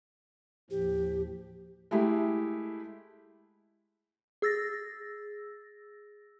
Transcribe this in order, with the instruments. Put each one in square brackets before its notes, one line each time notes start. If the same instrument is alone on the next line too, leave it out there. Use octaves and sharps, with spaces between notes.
[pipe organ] D#2 A2 F3 [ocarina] G4
[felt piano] G#3 A3 E4 G4
[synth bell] G#4 E6 A6 A#6